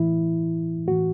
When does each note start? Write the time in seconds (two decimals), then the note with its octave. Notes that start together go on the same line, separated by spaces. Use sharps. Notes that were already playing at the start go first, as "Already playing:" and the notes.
Already playing: A2 E3 E4
0.88 A2 E3 F#4